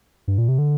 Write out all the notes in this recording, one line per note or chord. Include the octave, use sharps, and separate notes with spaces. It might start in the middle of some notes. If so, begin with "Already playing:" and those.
G2
A#2
C3
D3